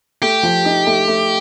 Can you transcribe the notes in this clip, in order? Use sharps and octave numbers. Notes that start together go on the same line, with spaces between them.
A3 G4
F3
D#4
A3
A3